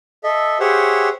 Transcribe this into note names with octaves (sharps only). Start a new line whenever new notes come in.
A4 D#5 E5
G4 G#4 C5 C#5 E5 F#5